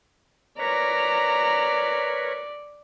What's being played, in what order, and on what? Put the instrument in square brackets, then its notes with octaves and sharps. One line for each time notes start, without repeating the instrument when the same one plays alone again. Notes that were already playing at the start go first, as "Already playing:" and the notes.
[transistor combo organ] A#4 B4 C#5 [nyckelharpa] D5 [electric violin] A#5